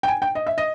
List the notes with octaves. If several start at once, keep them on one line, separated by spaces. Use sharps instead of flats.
G5
G#5
G5
D#5
E5
D#5